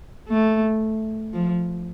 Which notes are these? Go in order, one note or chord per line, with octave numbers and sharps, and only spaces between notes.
A3
F3